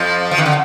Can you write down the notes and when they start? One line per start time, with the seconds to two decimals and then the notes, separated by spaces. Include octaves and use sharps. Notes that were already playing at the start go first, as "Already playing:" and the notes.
Already playing: F2 F3
0.31 F3
0.38 D#3
0.46 D3